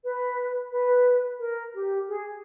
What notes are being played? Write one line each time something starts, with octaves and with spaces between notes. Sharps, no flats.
B4
B4
A#4
G4
G#4